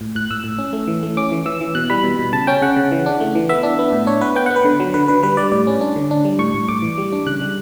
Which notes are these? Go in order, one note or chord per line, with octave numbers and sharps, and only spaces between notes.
A2
A2 F#6
A2 E6
A2
C#4
A3
E3
A3
C#4 D6
E3
E3 E6
E3
B2 F#6
G3 B5
B2
B2
C#3 A5
C#4 G5
C#3 F#5
C#3
E3
D4
A3
E3
B3 E5
D4
B3
A2
D4 C#5
B3 B4
B3 G5
F#5
B3
B4
D3
F#3
D3 B4
D3 B4
G3 B4
G3 D5
A2 D5
C#4
D4
D3
D4
G3
A2 C#6
A2
A2 D6
E3
G3
D4
C#3 F#6
G3